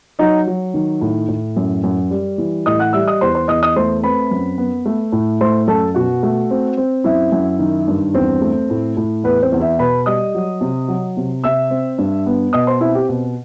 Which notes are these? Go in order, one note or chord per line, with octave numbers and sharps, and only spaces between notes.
F#3 D#4 D#5
F#3
D#3
A2
A2
F#2
F#2
G3
E3
A2 D#5 D#6
F#5 F#6
G3 E5 E6
D#5 D#6
E2 C5 C6
C5 C6
E2 D#5 D#6
D#5 D#6
A3 C5 C6
C4 B4 B5
F#2
B3
A3
A2
A3 C5 C6
F#2 A4 A5
B2 F#4 F#5
A3
C4
C4
F#2 E4 E5
F#2
D#3
G2
E2 C4 C5
A3
A2
A2
E2 B3 B4
C4 C5
E2
E4 E5
B2 B4 B5
G3 D#5 D#6
F#3
C3
F#3
C3
C3 E5 E6
C4
G2
B3
B2 D#5 D#6
C5 C6
C4 E4 E5
G4
B2